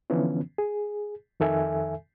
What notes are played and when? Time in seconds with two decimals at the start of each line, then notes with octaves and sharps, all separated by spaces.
0.10 D3 E3 F3 B3 C#4
0.58 G#4
1.40 F2 D#3 A4 E5 G#5